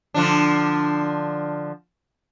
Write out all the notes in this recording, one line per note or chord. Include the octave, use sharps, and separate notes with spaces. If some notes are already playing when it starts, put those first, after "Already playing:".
D3 F3 D4